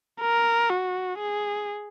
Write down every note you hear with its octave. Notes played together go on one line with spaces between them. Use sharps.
A#4
F#4
G#4